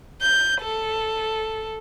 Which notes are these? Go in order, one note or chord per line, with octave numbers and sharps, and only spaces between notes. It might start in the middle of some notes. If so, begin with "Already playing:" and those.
G6
A4